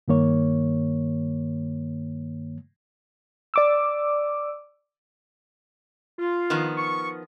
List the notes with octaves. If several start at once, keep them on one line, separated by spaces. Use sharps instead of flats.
G2 D#3 A#3 C#5
D5 D6 E6
F4
D#3 F3 B3
C#6